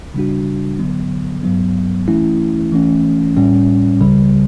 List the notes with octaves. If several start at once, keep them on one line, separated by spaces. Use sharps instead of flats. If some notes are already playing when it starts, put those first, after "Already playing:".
C#3 G3 D4 F#4
D3 F#3 B3
G2 F#3 B3
E3 A3 C#4 E4
E3 A3 C#4
A2 G3 C#4
C#2 C#3 G3